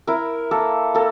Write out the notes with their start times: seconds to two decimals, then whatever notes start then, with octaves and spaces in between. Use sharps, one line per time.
0.07 E4 A#4
0.51 A#3 A4
0.95 A#3 A4